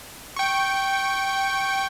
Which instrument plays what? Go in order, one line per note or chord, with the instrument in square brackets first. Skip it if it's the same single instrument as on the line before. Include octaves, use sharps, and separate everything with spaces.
[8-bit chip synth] G5 C#6